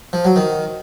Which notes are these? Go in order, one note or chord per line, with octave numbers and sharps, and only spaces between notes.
F3
F#3
D#3